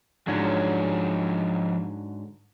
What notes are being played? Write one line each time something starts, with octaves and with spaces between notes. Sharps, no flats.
G#2 D3 F3 F#3 C#4